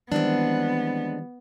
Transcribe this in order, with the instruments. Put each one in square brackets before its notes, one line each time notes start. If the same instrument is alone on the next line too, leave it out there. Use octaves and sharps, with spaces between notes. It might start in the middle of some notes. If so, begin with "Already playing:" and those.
[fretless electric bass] D#3 E3 G3 [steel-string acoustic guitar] G#3 C4 D4 [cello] B3